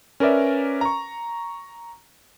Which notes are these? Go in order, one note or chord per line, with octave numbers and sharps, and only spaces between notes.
C#4 A#4 B4 D5 E5
A#5 C#6